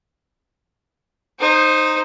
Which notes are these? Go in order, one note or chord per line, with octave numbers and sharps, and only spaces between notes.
D#4 C5